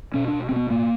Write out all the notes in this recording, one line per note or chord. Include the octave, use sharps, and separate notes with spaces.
B2 C#4
D4
B2
B2 C4
B3
A2 A#3